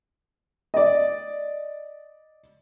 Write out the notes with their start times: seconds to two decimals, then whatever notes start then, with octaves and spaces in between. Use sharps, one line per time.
0.74 D5 D#5